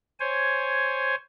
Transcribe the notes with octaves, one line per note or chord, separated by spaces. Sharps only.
C5 C#5 G#5